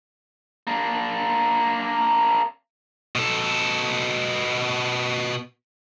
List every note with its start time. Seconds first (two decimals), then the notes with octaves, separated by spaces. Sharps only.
0.67 A#3 D4
3.16 B2 A4